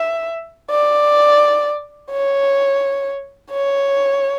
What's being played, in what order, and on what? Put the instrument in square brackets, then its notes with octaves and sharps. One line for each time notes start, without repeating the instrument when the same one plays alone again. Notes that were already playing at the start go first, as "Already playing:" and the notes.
Already playing: [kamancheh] E5
D5
C#5
C#5